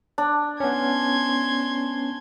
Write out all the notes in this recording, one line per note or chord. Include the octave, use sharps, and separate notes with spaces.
D4
B3 C#4 C6 G#6